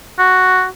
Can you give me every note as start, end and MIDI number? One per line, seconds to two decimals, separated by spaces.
0.19 0.66 66